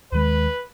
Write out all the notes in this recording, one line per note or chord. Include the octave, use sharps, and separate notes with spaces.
D#2 D#3 G#3 B4